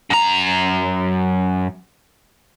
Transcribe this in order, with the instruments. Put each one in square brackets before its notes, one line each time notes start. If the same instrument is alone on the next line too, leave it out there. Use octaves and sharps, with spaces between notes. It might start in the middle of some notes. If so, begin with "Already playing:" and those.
[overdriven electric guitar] F#2 A#5